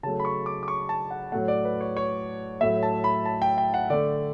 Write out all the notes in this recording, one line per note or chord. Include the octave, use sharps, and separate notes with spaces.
C#3 F#3 A3 A5
B5
C#6
D6
D6
C#6
A5
F#5
A2 F#3 A3 F#5
D5
B4
C#5
C#5
A2 F#3 A3 E5
A5
B5
A5
G5
G5
F#5
D3 A3 D5